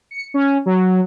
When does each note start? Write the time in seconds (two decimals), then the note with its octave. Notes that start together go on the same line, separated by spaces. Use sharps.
0.11 C#7
0.34 C#4
0.66 F#3